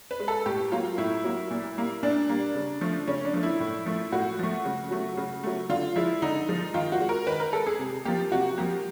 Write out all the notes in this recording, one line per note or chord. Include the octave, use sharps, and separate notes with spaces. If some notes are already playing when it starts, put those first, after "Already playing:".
B4
G#3
A4
A2 G4
F#3 A#3 F4
A2 E4
F#3 A#3
A#2
G3 A#3
A#2 D4
G3 A#3
C#3
F3 A3
C#3 C#4
D4
F3 A3
E4
A2
F3 A3
A2 F#4
F3 A3
C#3
F#3 A3
C#3
F#3 A3
D3 F4
F3 G#3 E4
D3 D#4
F3 G#3
D#3 F4
F#4
G#3
A#4
D#3 B4
A#4
G#3 A4
G#4
C3
F3 A#3 G4
C3 F#4
F3 A#3 G4